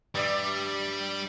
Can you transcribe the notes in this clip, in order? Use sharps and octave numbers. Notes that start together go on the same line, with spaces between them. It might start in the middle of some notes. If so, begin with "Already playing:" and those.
G2 G3 D5 E5